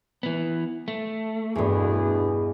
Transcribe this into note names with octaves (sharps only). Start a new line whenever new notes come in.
E3 B3
A3
E2 G2 B2 D4 G#4